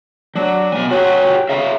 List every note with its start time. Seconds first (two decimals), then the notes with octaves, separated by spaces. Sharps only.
0.35 F#3 D4
0.72 B2 G#5
0.91 F#3 F#4 G4 G#5
1.49 C#3 E5 F5 A#5